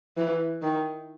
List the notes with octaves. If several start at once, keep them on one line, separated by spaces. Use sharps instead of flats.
E3
D#3